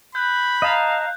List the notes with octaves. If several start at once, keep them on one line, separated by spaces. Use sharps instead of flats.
B5 F#6 G6
D#5 F5 A5 A#5